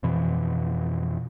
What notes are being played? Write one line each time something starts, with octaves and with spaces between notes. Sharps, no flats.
F2 B2 E3